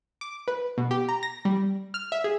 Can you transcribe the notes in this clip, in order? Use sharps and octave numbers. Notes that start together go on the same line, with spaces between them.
D6
B4
B2
G4
A#5
A#6
G3
F6
E5
G#4